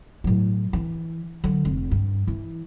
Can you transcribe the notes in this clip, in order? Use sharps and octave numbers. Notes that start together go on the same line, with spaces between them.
A2 F#3
E3
D3 F#3
F1
G2
E3